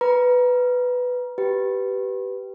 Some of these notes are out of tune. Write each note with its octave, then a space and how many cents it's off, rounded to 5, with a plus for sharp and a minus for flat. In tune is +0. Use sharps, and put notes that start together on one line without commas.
B4 +5 A#5 +30
G4 -15 B4 +0